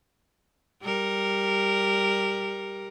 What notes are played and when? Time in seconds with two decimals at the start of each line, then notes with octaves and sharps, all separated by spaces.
0.83 G3 A#4